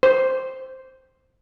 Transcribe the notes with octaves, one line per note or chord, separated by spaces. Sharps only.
C5